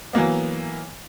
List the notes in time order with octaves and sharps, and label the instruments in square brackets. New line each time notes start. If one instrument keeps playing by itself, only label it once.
[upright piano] E3 F#3 A#3 B3